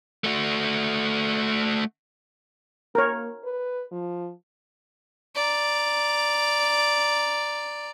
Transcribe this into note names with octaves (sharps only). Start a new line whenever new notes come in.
A3 F#4
A#3 A#4 C#5
B4
F3
D5 A#5